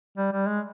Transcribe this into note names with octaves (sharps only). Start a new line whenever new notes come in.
G3
G3
G#3